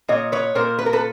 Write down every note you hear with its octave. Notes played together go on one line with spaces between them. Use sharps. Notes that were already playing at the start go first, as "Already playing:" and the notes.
A#2 C#5 D#5
B4 C#5
A#2 A#4 C5
B4
A#4
A4 B4